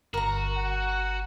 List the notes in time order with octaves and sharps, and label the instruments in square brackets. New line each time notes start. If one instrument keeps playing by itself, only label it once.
[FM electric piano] G1 [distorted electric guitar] F#4 [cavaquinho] A#4 A#5
[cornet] F#5